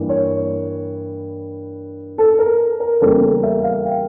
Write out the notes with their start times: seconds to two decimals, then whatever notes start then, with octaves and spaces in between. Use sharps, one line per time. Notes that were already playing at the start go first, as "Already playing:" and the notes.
Already playing: G2 E3 A#3
0.09 C#5
2.18 A4
2.39 A#4
2.80 A#4
3.01 E2 C#3 G3 A#3 A4
3.23 A4
3.43 E5
3.64 F5
3.85 G5